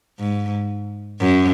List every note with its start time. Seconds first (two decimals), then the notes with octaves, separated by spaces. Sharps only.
0.19 G#2
1.20 F#2